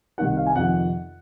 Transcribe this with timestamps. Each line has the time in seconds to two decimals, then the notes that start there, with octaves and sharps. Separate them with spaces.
0.18 C2 C3 D#3 F#5
0.37 F5
0.46 G#5
0.55 F2 C3 D#3 F#5